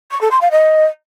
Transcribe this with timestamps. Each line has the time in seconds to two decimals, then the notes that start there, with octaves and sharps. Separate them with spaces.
0.11 C#6
0.21 A4
0.31 C6
0.41 F5
0.51 D#5